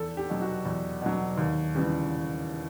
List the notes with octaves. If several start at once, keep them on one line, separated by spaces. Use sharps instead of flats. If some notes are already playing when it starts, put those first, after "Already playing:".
Already playing: E2 A4
G4
B2 F#3
F#4
E2
B2 F#3
D#2
C#3 E3 G3